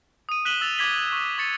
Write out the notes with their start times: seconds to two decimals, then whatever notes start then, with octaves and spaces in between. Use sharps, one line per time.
0.29 D#6 D#7
0.45 F#6 B6 D#7 E7 F#7 G7
0.61 E6 A6 F7
0.78 D6 G#6 B6 G7
1.12 C#6
1.38 C#6 A6 C#7